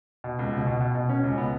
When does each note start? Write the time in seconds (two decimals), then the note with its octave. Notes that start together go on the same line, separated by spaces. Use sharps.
0.24 B2
0.39 C#2
0.53 B2
0.67 B2
0.81 B2
0.95 B2
1.09 C#4
1.24 C#2
1.38 B3